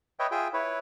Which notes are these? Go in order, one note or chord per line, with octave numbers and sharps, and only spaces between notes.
B4 C#5 D#5 E5 G5
F4 G#4 E5 G5
E4 B4 C#5